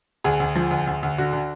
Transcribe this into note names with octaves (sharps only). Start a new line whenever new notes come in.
D2 G#4
D2
F3
D2
D2
D2
D3 F#4
D3